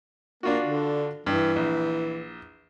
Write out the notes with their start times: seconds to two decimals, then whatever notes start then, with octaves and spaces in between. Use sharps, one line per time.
0.43 A#3 D4 F4 F#4
0.64 D3
1.26 G2 E3
1.56 A#1